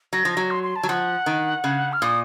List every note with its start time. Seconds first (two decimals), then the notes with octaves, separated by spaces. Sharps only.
0.13 F#3 A#6
0.25 F3
0.32 F#3 A#6
0.51 C6
0.63 C6
0.76 A5
0.83 F#3
0.89 F3 F#5
1.26 D#3
1.64 C#3
1.93 F6
2.02 A#2 D#6